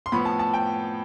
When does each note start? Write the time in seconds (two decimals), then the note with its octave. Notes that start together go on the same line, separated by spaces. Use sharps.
0.06 C6
0.12 A2 F3 B3 B5
0.25 A5
0.39 A5
0.54 G5